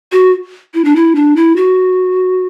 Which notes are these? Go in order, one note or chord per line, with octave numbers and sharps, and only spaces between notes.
F#4
E4
D4
E4
D4
E4
F#4